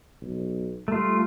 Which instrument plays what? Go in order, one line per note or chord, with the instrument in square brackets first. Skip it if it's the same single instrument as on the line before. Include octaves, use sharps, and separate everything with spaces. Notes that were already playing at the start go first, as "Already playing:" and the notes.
[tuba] B1
[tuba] G3 [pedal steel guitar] A3 F4